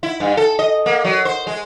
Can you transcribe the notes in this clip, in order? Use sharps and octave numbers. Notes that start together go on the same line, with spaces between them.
E4
G2
A4
D#5
A#3
F#3
C5
G#3